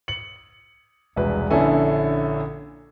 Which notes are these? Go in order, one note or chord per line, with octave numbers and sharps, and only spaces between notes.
C#7 F#7
E1 C2 B4
A#1 D3 C#4 E4 A4 G#5